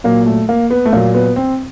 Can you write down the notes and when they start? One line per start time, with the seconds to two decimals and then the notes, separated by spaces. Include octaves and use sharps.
0.04 A#2 F#3 A#3
0.26 A3
0.49 A#3
0.71 B3
0.86 A3
0.93 A#2 F#3 A#3
1.15 B3
1.36 C4